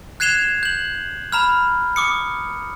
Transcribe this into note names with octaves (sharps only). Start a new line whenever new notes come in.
F#6 G#6 C7 E7 F7 G7
G6 F#7
A#5 B5 F6
D6 D#6 C#7